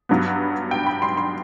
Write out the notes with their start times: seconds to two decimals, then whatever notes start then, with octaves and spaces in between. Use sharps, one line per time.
0.09 G2 F#3 B3
0.71 G5
0.86 B5
1.02 C6
1.17 C6